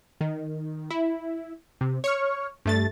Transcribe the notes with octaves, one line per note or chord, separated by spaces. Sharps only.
D#3
E4
C3
C#5 C#6 F6
G2 A3 A6